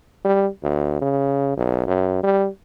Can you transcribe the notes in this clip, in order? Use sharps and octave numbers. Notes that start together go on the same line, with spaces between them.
G3
D2
C#3
B1
F#2
G3